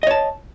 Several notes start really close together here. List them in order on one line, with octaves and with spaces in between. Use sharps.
D#5 C#5 A5